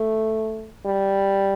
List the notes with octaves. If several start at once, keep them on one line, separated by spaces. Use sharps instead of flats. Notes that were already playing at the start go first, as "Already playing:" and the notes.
Already playing: A3
G3